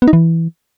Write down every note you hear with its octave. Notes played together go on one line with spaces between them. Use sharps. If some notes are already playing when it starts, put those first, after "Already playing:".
B3
D#4
E3